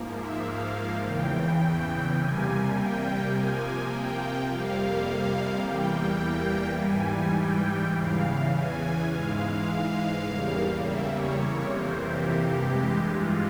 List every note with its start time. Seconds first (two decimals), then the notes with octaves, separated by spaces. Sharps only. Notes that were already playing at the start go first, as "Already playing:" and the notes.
Already playing: G#2 F3 A#3
0.12 E5
0.41 F5
0.99 E2 C#3 E3 G5
1.57 G5
2.14 C3 G3 A#3 G#5
2.72 G5
3.30 C3 F3 A#3 G#5
3.87 G5
4.46 F2 C3 G3 A#3 F5
5.03 F5
5.61 E2 E3 G3 A#3 G5
6.76 G#2 E3 G3 G#5
7.34 G5
7.92 E2 C#3 E3 F5
8.50 G#5
9.07 G#2 E3 G#3 F5
10.23 E2 C#3 G3 A#3
10.80 E5
11.09 C#5
11.38 F2 C3 E3 A#3 C#5
11.68 C5
11.96 G4
12.54 G2 E3 G#3
13.11 F4